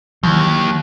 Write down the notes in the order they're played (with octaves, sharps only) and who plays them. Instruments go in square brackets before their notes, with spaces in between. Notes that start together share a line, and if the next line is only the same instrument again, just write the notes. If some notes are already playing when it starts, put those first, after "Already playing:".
[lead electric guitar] D#2 [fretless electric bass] D#3 E3 F#3